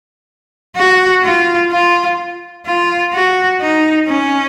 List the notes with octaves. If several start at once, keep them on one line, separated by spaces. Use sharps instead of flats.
F#4
F4
F4
F4
F#4
D#4
C#4